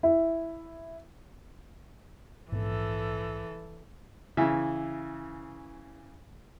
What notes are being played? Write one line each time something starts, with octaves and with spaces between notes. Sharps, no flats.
E4
A#1 G#2 E3 B3 A4
C#3 E3 E5